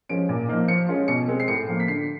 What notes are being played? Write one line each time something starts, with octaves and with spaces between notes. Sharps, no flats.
F3 G#3 C#4 D7
A#2
F3 A#3 D#4
F3 C#7
G#3 C#4 F4
B2 C#7
G#3 C4
C7
A2 C#7
F3 A#3
B6
D3 C7